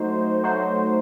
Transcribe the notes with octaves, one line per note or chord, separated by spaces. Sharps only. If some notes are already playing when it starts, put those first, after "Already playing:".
Already playing: F#3 A3 D#4 F#4 C5
F#3 A3 D#4 F#4 C5